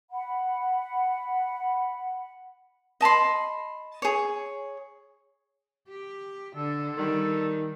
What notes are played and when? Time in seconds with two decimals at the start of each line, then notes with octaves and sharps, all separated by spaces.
0.11 F#5 B5
3.01 D#5 A5 B5 C6
4.02 G#4 C#5
5.89 G4
6.56 D3 A4
6.97 D#3 G3